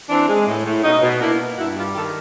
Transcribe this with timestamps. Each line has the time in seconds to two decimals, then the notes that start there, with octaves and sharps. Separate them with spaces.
0.09 E3 C4 D4
0.29 G#3
0.47 A2
0.65 A2
0.83 B2 C#4 D#4
1.02 B2
1.21 A#3 D4 E4
1.40 A#3
1.58 G2 E4 F#4
1.76 G3 F4 G4
1.95 D#3 G4 A4